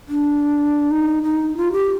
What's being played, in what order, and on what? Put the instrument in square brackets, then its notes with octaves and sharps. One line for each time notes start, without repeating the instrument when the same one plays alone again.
[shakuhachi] D4
D#4
D#4
F4
G4